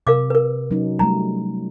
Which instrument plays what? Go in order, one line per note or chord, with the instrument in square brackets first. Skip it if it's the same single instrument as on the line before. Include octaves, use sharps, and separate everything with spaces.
[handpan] C3 [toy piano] A#4 F5 D6
[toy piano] A#4 B4
[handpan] F#3 C#4 D#4
[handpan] F#3 G3 A3 [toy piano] A#5